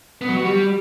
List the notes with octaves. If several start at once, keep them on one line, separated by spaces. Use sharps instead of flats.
B3
F#3
F#4
G3